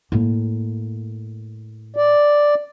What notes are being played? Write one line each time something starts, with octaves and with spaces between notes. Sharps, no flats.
A2 A#3
D5